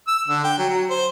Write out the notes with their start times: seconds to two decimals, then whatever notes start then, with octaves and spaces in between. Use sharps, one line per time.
0.07 E6
0.28 D3
0.44 G5
0.59 F#3
0.70 F#3
0.90 C5